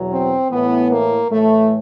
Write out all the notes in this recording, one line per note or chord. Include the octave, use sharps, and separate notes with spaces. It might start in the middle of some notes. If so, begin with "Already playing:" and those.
Already playing: E2 B2 F#3
C4
A2 E3 B3
A#3
A2 E3 A3